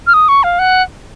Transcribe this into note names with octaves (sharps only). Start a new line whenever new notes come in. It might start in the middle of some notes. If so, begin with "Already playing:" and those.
F6
D#6
C#6
F5
F#5